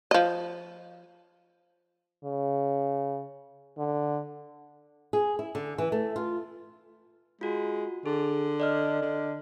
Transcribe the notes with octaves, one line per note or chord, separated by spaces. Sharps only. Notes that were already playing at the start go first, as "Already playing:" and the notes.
F3 D#5
C#3
D3
G#4
E4
D3
E3
A3
F4
G#3 F4 F#4
D3 G#4
D5 D#5 F6
D3